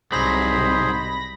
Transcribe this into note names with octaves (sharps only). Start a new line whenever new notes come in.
C2 G#2 F#3 G#4 C5 B5 A#6